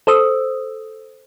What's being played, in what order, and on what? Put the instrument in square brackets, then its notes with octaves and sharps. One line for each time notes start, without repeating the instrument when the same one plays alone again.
[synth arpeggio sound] A4 C5 D#6 E6